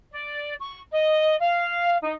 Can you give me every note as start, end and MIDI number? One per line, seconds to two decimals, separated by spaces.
0.10 0.55 74
0.59 0.80 85
0.91 1.36 75
1.40 1.97 77
2.03 2.12 63